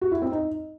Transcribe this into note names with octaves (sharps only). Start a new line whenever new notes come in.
F#4
E4
C4
D#4